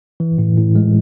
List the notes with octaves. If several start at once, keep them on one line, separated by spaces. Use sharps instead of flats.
E3
A2
A2
G#3